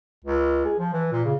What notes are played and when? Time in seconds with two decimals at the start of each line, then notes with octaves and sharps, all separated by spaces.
0.24 C#2
0.65 G#4
0.79 F3
0.93 E3
1.12 A#2
1.25 C#3